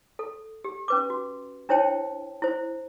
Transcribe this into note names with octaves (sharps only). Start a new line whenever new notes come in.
A4
G4
C#4 B4 D6
F#4
D4 E4 C5 C#5 G5 A5
E4 C5